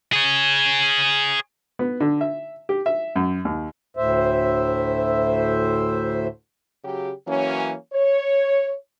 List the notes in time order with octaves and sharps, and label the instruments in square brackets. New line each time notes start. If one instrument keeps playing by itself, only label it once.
[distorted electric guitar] G#4 C#5
[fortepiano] B3
D3
E5
G4
E5
F#2
D#2
[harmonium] D2 A2 C5 E5
[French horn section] C#3 F#3 G4
E3 F#3 A#3 C#4
C#5